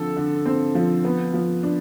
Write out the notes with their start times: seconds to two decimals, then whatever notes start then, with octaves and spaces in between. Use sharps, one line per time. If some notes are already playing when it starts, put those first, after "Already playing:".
Already playing: D3 F3 C4 A4
0.16 D3
0.46 C4
0.75 F3
1.05 B3
1.34 F3
1.63 D4